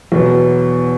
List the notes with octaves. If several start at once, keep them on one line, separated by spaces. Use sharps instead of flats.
E2 B2 F#3 B3